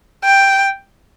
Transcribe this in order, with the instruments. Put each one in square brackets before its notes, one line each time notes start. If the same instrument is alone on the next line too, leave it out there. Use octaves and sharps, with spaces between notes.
[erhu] G5